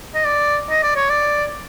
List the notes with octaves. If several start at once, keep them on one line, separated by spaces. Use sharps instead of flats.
D#5
D5
D#5
D5
C#5
D5